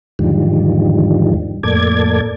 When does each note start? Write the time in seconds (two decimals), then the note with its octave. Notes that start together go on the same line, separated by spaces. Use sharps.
0.19 E2 G#2 D3 D#3 F3 G3
1.63 F2 A2 A#3 A4 D5 G#6